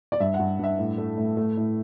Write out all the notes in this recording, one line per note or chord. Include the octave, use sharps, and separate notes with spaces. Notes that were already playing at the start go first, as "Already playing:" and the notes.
D5
G2 E5
F#5
G2
G2 E5
A2
A3
A2
A3
A2